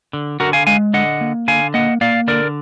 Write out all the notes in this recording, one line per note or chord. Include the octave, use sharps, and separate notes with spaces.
D3
D3 F#4 A#4
F5 G#5
G#3 F5 G#5
D3 D#5 F#5
A#3
D3 F5 G#5
A#3 D#5 F#5
A#3 D5 F5
D3 A#4 D5